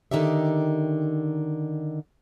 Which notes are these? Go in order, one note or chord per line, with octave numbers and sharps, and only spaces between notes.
D3 D#3 D#4 G4 E5